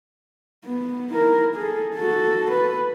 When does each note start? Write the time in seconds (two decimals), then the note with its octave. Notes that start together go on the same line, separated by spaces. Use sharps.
0.65 B3
1.13 E4 A#4
1.55 G#4 A4
1.96 F#4 A4
2.51 B4